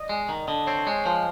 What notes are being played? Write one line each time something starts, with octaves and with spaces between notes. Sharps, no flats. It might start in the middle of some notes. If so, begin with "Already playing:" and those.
Already playing: D5 D#5
G#3
D#3
D3 D#5
C4 C#5
G#3 C#5
F3 C5